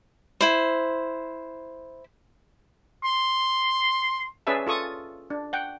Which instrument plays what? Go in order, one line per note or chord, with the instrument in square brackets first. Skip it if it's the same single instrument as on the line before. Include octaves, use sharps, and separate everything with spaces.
[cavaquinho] E4 C5
[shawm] C6
[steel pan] C#4 G#4 B4 D5 E5 A5
F4 A4 C#6 D#6
D4
F#5 G5